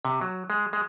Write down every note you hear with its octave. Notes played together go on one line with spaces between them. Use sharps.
C3
F#3
G#3
G#3